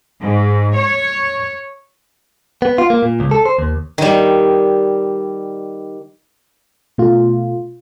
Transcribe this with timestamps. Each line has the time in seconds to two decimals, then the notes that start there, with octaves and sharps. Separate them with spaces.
0.20 G#2
0.75 C#5
2.62 B3
2.78 F4
2.90 A#3
3.02 A#2
3.20 C#2
3.31 A4
3.46 C5
3.59 D#2
3.98 D#3 G3
6.98 B2 A3 F4